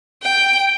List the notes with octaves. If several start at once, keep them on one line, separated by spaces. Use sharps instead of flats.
G5